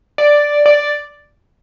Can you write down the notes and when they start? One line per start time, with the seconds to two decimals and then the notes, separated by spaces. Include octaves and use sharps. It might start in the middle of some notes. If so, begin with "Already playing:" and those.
0.18 D5
0.66 D5